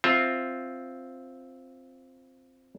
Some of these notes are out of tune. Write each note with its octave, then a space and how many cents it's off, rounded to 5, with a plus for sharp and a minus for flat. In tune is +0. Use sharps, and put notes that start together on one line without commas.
C4 +0 F4 +0 E5 +0